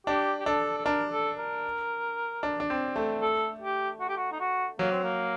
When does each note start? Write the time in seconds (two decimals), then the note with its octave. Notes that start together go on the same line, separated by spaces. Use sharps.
0.07 D4 G4
0.41 G4
0.46 D4 A4
0.78 A4
0.86 D4 A#4
1.12 A4
1.38 A#4
2.43 D4
2.60 D4
2.70 C4
2.96 A3
3.22 A4
3.62 G4
4.00 F#4
4.09 G4
4.17 F#4
4.32 D#4
4.40 F#4
4.79 F#3 A#3
4.92 C4
5.04 A#3